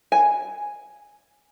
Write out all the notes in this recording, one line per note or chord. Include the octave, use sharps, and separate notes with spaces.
G#5